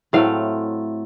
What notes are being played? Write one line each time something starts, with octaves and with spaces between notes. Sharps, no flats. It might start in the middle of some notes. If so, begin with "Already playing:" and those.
A2 F#3 A3 C4 F5